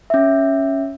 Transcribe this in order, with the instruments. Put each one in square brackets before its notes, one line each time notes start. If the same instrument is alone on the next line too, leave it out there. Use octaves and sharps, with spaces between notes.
[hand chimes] C#4 E5